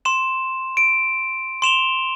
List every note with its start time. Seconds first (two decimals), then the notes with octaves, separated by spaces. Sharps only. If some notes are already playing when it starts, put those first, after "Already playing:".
0.05 C6 E7
0.77 D7
1.62 C6 E7 F7 G7